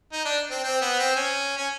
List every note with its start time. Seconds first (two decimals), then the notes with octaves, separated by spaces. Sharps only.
0.12 D#4
0.25 D4
0.51 C4
0.63 C4
0.81 B3
0.99 C4
1.16 C#4
1.57 C#4